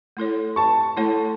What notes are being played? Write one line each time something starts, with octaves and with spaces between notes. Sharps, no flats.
A3 E4 A4 C#5
A5 C#6
A3 E4 A4 C#5